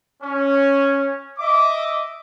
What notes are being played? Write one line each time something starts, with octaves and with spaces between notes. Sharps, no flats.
C#4
D#5 E5 D6